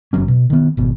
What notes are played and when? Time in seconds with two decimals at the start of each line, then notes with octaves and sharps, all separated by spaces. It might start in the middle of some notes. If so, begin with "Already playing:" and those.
0.13 F#1 E2 F#3 C#4
0.28 B2
0.50 D#3 B3
0.77 G#1 B2